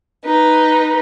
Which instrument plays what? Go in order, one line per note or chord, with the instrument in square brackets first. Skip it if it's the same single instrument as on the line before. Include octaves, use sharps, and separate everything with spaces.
[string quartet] D#4 B4